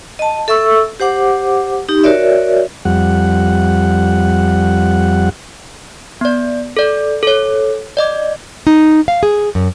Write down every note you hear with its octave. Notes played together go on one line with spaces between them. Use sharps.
D#5 A5
A4 E5 C#6 E6
G4 C5 F#5 D6
D#4 G4
F#4 A#4 C#5 D5 E5
F2 G3 F#5
B3 D5
A4 D5
A4 C#5
D5 D#5 D6
D#4
F5
G#4
F#2